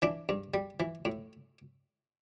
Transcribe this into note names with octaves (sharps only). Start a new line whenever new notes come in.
E3 D4
G2
G3
E3
A2